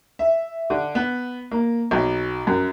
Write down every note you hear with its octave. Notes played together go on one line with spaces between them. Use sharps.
E5
D3
B3
A#3
B1
F#2